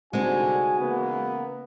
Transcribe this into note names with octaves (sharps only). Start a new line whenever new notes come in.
C2 D3 G#3 C4 D#4 F#4 G#5
C#3 E3 A#3 B3